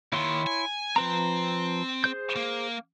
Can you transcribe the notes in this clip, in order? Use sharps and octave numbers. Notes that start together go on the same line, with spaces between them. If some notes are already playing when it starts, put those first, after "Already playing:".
D#2 D#3 E4 C#5 C6
G#5
F3 C4 B4 A#5
G#4 C5 G6
A#3